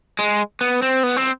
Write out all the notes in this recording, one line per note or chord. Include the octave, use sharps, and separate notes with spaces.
G#3
B3
C4
B3
C4